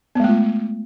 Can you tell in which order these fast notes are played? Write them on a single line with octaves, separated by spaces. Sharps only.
B3 G#3 A3 F4